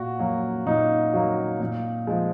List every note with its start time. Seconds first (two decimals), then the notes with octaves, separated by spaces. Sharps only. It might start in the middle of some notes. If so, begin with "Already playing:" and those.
Already playing: A#2 F#4
0.19 F#3 A#3
0.66 A#2 D#4
1.13 F#3 A#3
1.60 A#2
2.07 F3 G#3